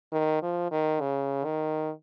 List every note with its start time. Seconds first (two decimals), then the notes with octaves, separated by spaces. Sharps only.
0.13 D#3
0.43 F3
0.71 D#3
1.01 C#3
1.45 D#3